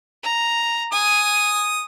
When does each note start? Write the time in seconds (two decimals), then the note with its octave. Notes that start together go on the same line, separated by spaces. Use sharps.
0.23 A#5
0.93 G#5 D#6